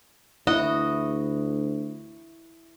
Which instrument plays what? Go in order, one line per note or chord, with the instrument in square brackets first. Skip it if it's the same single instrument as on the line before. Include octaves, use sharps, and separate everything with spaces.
[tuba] D2 [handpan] E4 [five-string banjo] F#4 [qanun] D#5